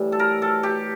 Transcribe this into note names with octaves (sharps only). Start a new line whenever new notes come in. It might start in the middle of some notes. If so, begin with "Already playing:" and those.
Already playing: A2 E3 G3
A4
A#4
A4
G4